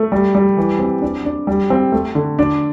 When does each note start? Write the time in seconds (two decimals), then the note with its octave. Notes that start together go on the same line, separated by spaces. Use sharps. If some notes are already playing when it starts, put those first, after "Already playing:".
Already playing: A3
0.12 G3
0.35 G3
0.57 E3
0.79 C4
1.02 D4
1.25 D4
1.47 G3
1.70 C4
1.92 A3
2.15 D3
2.39 D4